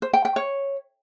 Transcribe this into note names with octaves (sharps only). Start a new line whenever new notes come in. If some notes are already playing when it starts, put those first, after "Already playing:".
C5
G5
G5
C#5